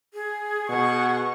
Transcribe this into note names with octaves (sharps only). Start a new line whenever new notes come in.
G#4
B2 F#5 C#6